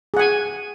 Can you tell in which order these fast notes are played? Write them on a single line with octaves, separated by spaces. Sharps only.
G#4 F#5 G#5